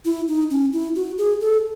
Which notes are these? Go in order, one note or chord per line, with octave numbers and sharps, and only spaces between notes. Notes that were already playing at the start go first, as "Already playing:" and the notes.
E4
D#4
C#4
E4
F#4
G#4
A4